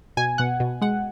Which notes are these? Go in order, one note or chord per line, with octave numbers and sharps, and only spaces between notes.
B2 G#5
B2 F#5
B2
G#3 F#5